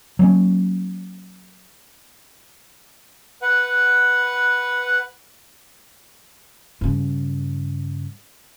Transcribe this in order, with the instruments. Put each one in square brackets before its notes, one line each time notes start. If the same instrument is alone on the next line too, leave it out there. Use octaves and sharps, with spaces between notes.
[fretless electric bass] F#3 A#3 C4 C#4
[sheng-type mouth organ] B4 F#5
[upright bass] G2 C#3